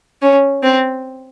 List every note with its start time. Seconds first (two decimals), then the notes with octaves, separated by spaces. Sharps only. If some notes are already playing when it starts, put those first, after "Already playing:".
0.22 C#4
0.63 C4